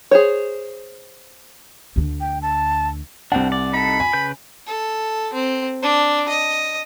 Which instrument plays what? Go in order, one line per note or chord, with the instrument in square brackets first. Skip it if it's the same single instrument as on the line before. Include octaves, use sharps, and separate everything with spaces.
[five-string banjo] G#4 C5 C#5
[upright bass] D2 D3
[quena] G5
A5
[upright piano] C2 F#5 [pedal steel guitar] C4 D4
[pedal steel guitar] D5
[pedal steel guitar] D#4 A4 [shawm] B5
[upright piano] G#5
[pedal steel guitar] C#3 B4 G6
[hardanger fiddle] A4
C4
D4
D#5